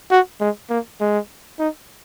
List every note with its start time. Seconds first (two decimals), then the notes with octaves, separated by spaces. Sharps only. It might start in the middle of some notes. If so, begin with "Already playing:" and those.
0.11 F#4
0.40 G#3
0.70 A#3
1.01 G#3
1.59 D#4